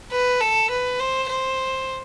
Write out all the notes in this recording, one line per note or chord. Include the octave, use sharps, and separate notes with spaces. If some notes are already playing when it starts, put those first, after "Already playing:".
B4
A4
B4
C5
C5